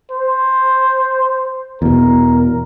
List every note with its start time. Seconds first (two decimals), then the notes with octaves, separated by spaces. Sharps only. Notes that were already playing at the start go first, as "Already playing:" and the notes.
0.11 C5
1.82 E2 B2 A#4